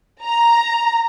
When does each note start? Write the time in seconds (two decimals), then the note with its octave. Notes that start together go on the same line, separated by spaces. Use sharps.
0.23 A#5